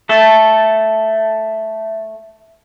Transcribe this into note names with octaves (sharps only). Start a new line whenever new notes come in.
A3 A4